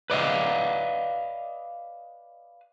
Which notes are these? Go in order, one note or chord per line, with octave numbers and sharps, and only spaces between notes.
B4 D5 D#5 F5